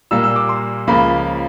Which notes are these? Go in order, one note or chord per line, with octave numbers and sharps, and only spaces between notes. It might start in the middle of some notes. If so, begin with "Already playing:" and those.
A#2 G3 A#3 E6
E6
D6
C6
C#2 C#3 F3 A#3 B5